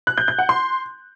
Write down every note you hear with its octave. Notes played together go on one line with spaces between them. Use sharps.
F#6
G6
G6
F#5
C6